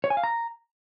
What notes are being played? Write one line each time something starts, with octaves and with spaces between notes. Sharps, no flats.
C#5
G#5
F5
A#5